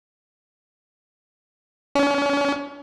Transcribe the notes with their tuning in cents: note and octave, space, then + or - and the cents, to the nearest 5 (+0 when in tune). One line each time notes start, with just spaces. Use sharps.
C#4 +35